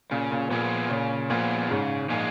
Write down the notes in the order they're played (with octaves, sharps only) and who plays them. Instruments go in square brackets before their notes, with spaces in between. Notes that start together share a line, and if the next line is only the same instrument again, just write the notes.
[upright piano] A#2 [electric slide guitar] C#3
[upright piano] A#2
[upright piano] A#2 [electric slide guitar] F3 B3 F4 G#4
[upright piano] A#2 [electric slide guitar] C#3
[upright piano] A#2 [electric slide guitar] F3 B3 F4 G#4
[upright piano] G#2 [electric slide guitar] C#3
[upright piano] A#2 [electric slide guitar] F3 G#3 D#4 G#4